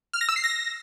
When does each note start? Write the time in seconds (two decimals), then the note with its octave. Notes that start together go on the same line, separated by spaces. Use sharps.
0.13 F6
0.21 A#6
0.29 E6
0.36 C7
0.44 A#6